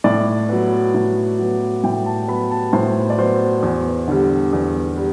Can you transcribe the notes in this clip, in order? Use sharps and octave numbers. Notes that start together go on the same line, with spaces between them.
A2 D5
F#3 B3
A2
F#3 B3
A2 G5
A5
F#3 B3 B5
A5
A2 C5
D5
F#3 B3 C5
E2
D3 G3
E2
G3